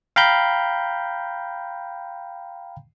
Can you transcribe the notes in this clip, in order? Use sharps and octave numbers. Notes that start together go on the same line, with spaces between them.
F5 G5 A#5 B5 G6